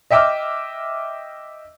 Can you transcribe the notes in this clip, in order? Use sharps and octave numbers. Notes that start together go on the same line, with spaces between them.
D#5 E5 G5 D6 E6 F6